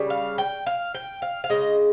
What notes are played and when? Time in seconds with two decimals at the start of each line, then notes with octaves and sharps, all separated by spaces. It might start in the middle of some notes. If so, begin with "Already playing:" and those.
Already playing: C#3 G3
0.10 F5
0.38 G5
0.66 F5
0.95 G5
1.22 F5
1.44 F5
1.50 C#3 G#3 D#5